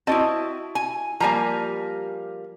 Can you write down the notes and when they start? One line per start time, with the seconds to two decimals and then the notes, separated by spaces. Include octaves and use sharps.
0.07 C4 E4 F#4 D#5 A5
0.75 G#5
1.20 F3 G3 A#3 G#5 A#5